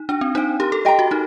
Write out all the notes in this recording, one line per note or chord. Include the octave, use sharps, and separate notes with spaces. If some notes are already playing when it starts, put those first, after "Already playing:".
Already playing: D#4
D4 F#4
C4
D#4 C5 G5
G4 A#4
A4
G4 D#5 G5 A#5
F#4
D#4 A#4